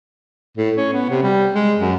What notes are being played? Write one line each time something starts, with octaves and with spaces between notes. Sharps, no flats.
A2
C#4
B3
C3
G3
G#3
F#2